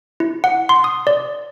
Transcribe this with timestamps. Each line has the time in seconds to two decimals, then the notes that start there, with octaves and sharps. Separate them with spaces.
0.20 E4
0.44 F#5
0.69 C6
0.84 D#6
1.07 D5